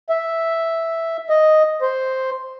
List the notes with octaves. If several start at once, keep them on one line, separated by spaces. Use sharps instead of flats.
E5
D#5
C5